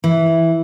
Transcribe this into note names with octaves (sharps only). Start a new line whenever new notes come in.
E3